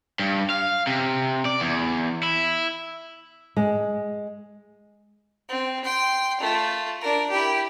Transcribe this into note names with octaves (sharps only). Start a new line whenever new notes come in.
G2
F5
C3
D5
E2
E4
G#3
C4
G5 C6
A3 F4
D4 A#4
E4 G4